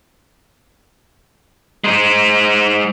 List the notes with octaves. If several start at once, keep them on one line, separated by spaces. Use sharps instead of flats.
G#3 C5